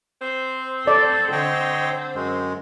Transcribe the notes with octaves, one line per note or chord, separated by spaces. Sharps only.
C4 C5
A4 D5
D3 C#5 D#5 G5
F#2 G#3